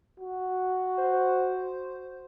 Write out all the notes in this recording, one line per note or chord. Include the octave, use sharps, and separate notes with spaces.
F#4
C5